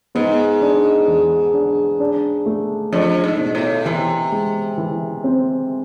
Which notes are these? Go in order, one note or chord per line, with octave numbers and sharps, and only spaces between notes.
G#2 B3
D4
E2
D4
D4
A3
F2 D4
G#2
B2
A2
C3 E3
G#3
E3
C4